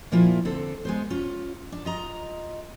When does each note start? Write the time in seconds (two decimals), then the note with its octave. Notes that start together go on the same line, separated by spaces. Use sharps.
0.12 A#2 F3 A#3 E4 F4
0.45 D3 C4 A4
0.85 G#3 B3 C5
1.10 C#4 F4
1.72 D4
1.85 F4 D#5 A#5